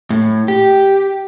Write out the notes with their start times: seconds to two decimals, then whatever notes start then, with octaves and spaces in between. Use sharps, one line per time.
0.10 A2
0.48 G4